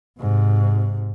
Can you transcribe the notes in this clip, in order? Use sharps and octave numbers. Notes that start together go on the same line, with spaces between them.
G#2 C3